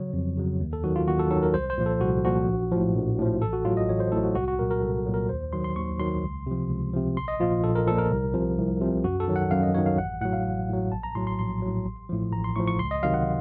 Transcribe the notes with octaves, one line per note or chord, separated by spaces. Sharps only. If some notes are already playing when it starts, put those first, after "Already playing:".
Already playing: C#3 F#3 C#5
F2
C#3 F#3
D#2
A4
D#3 F#3 F#4
F4
D#2 F#4
A4
D#3 F#3 A4
A#4
C2 C5
C5
A#2 F3
A4
C2 F#4
A#2 F3 F#4
A#1
A2 F3
A#1
A2 F3
A1 A4
F#4
A2 F#3 F4
D#5
A1 C#5
C5
A2 F#3 A4
F#4
C2 F#4
F#4
A#2 F#3 A#4
A#4
C2 A4
A#2 F#3
A#4
D#2 C5
D#3 F#3 C6
C6
D#2 C#6
D#3 F#3 C6
C#2
C3 F3
C#2
C3 F3
A#1 C6
D#5
A#2 F3 F4
A#1 A4
A#4
A#2 F3 A4
A#4
C2
C3 F3
C2
C3 F3
F#2 F#4
A4
D#3 F#3
F#5
F#2 F5
D#5
D#3 F#3 C#5
F5
A1 F#5
A2 F#3 F#5
F5
A1
A2 F#3
A#1 A5
A#5
A2 F#3 C6
C6
A#1 C6
A2 F#3
A1
A2 F3
A1 A#5
C6
A2 F3 C#6
C#6
C#2 C6
D#5
C3 D#3 F#3 F5
F#5